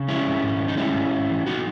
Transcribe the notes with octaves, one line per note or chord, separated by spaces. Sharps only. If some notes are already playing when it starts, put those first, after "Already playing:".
Already playing: C#3
G#3 C#4 E4
G#2
G#2
D#3
D#4
G#3 C#4 E4
G#2
G#2
E3
F#3 D#4 F#4